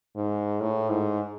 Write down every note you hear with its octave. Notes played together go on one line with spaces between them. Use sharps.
G#2
A2
G#2